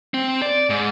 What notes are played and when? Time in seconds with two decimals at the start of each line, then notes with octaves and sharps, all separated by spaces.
0.14 C4
0.42 D5
0.70 G#2